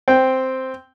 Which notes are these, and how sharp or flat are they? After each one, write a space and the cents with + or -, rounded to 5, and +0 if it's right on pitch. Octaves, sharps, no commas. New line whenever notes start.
C4 +0 G5 +0